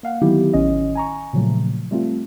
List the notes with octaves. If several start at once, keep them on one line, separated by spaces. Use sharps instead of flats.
A#3 F5 F#5
D3 D#3 F#3 B3 E4 G4
A1 D#3 C#4 D#5
G#5 A#5 C#6
A#2 C#3 F3 F#3 A3
G3 A3 C4 F4